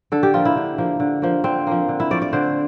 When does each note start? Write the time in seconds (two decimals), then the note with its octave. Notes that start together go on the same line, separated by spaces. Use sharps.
0.12 D3 A4
0.23 G4
0.34 F3 A#3 F4
0.45 E4
0.56 D3
0.78 F3 A#3
1.00 D3
1.22 F3 A#3
1.44 D3 C4
1.67 F3 A#3
1.88 D3
2.00 E4
2.11 F3 A3 D5
2.22 D5
2.33 D3 C5